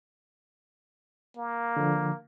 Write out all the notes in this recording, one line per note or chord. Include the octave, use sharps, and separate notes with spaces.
A#3
D3 F3